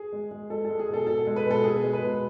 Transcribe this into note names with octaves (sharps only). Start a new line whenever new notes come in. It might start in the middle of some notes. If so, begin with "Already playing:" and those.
Already playing: G#4
G#3
G#3
G#3 A4
G#3 A4
G#4
B2 A4
B2 A4
G#3
B4
B2 A4
B2 G#4
G#3
B4
B2